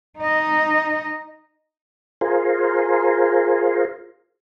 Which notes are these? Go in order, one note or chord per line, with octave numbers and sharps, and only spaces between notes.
D#4 D#5
F4 G#4 A#4 C5